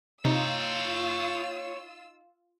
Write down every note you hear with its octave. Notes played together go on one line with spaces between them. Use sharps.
C3 D#4 F4 C#5 G5 E6